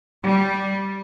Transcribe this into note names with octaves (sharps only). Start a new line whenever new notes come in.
G3